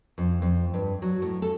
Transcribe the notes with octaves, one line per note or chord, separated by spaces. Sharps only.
F2
F2
G2
F#3
A2
A4